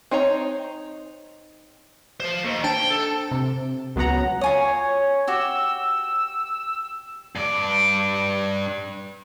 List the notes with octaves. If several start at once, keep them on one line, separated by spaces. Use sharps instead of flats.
C4 D#4 C#5 A#5
F3 C5
D#2
D4 C5 G5 A5
A4
C3
C#2 F#3 B3 F#5 A#5
F4 C#5 G#5 D#6
F#4 G4 E6
G2 D5